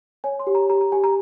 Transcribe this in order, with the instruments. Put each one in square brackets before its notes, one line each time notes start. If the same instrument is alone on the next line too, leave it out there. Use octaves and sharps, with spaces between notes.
[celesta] C#5 G#5
C6
G4
A#5
G4 A#5
A#5
G4 G#5
A#5